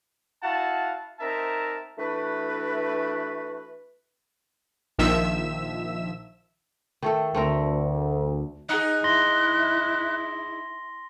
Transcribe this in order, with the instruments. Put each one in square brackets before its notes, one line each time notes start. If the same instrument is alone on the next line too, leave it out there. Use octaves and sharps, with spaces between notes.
[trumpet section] E4 F#4 F5 F#5 A5
C4 D#4 A#4 E5 A5 A#5
[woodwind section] E3 A3 D4 F#4 B4
[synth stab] A#1 D#3 F3 E5 E6 E7
[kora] D#3 A3 A4
[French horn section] D2 [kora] A3 C4 A#4
[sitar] D#4 G#4 [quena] F#6
[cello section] E4 [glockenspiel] C6 A#6 G7